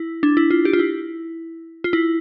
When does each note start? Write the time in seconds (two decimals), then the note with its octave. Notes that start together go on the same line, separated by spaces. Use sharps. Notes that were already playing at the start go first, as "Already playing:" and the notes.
Already playing: E4
0.23 D4
0.37 E4
0.51 F4
0.65 G4
0.73 F4
0.79 E4
1.84 F4
1.93 E4